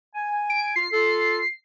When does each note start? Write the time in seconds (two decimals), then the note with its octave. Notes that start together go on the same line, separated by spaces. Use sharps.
0.15 G#5
0.50 D7
0.76 F4 C7
0.92 F4 A4